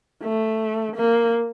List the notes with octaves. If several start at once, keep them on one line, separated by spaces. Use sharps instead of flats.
A3
A#3